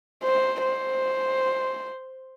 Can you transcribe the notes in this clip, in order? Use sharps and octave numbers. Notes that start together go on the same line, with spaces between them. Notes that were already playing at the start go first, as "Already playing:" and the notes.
C5
C5